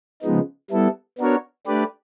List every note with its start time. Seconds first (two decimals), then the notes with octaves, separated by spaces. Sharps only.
0.22 C#3 F3 G#3 B3 D#4
0.71 G3 B3 E4 A4
1.18 B3 D4 F#4 A#4 C#5
1.67 A3 D4 G4 B4 D5